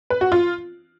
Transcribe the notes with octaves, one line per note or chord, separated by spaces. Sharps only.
B4
F#4
F4